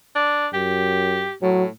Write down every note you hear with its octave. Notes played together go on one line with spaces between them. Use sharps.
D4
F#2 G4
A2 F#3